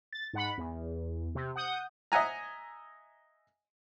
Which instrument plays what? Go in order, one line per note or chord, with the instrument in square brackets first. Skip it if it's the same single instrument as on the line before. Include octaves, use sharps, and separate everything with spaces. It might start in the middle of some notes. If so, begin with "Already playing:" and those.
[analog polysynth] A6
G#2 F#5 B5
E2
C3
F#5 D#6 G6
[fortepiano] D#5 E5 F#5 G#5 A#5